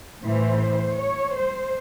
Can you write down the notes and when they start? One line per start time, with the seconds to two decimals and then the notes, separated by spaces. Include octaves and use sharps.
0.22 A2 E3 C5
0.96 C#5
1.34 C5